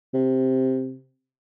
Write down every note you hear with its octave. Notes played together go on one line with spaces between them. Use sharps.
C3